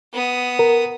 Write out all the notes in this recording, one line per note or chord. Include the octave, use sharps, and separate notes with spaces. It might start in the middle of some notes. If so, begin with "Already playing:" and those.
B3 D#6
A#4